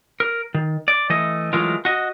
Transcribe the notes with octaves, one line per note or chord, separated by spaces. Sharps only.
A#4
D#3
D5
E3 A3 D#5
E3 F#3 G#3 A3 F4 A#4
F#4 D#5